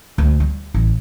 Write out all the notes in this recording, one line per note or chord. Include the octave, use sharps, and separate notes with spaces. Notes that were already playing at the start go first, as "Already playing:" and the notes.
D2
G3
A1